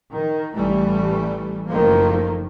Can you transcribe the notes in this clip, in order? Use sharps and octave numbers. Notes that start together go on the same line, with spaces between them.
D#3
A1 E3 G3 A3
F#1 D#3 F3 A3 A#3